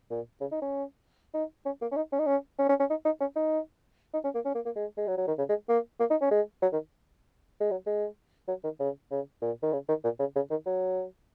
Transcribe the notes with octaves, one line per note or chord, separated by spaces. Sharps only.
A#2
C#3
D#4
C#4
D#4
C#4
A#3
C#4
D#4
C#4
D#4
C#4
C#4
C#4
C#4
D#4
D#4
C#4
D#4
D#4
C#4
A#3
C#4
A#3
A#3
G#3
G#3
F#3
F#3
D#3
C#3
G#3
A#3
A#3
D#4
C#4
G#3
F#3
D#3
G#3
F#3
G#3
F#3
D#3
C#3
C#3
A#2
D#3
C#3
D#3
A#2
C#3
C#3
D#3
F#3